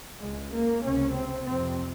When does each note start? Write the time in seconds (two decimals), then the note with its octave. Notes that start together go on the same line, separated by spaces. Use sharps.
0.21 C#2 C#3 G#3
0.51 A#3
0.82 C#2 C3 C#4
1.14 C4
1.45 F2 C3 C4